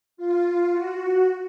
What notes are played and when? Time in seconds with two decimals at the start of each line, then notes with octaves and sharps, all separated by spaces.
0.17 F4
0.71 F#4